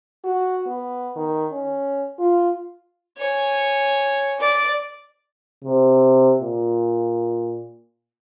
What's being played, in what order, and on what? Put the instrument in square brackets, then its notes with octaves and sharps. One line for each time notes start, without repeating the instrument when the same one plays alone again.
[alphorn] F#4
B3
D#3
C#4
F4
[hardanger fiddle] C#5 G#5
D5
[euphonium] C3
A#2